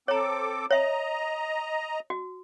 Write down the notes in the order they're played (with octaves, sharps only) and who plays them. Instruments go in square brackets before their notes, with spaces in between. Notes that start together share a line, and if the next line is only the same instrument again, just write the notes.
[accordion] C4 A4 D6 [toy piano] C#5 A#5
[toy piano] C#5 E5 [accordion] D#5 A#5
[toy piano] F#4